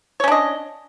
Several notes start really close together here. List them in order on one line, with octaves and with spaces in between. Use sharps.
C#5 C#4 D4 D#5